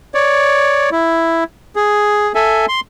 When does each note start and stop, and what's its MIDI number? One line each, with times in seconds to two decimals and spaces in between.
0.14 0.90 73
0.14 0.90 74
0.92 1.44 64
1.76 2.32 68
2.35 2.66 69
2.35 2.66 76
2.35 2.66 80
2.68 2.80 84